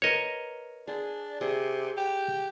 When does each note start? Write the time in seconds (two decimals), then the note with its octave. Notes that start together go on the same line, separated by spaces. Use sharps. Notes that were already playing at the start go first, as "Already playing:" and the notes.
0.02 A#4 B4 C#5 D#5
0.87 D4 G#4
1.41 C3 G#4
1.97 G4